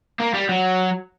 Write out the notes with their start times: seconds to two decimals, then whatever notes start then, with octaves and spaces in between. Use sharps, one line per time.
0.20 A#3
0.34 G3
0.49 F#3